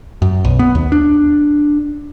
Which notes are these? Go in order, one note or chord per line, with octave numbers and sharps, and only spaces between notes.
F#2
B1
B3
D#2
D4